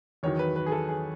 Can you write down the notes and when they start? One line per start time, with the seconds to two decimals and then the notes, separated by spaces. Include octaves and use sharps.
0.23 E2 D#3 F#3 C#5
0.39 B4
0.56 B4
0.66 G#4
0.72 A4
0.88 G#4